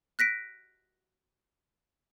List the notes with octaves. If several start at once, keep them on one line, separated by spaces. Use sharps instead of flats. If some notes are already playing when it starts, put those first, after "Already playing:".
F#6 A#6 B6 D7